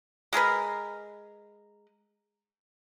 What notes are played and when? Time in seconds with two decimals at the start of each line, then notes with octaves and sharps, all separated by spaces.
0.33 G#3 G#4 A#4 B4